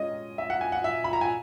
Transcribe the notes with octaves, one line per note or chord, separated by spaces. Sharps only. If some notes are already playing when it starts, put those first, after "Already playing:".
Already playing: G#3 C#4 D#5
E5
F#5
G#5
F#5
E5
B5
A#5
G#5